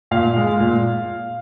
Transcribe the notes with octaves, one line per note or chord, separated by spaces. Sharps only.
A#2 F5
G#3
A#2